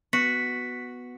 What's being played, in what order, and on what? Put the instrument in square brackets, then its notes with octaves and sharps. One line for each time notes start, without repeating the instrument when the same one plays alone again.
[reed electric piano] B3 [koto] F#4 [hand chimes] B6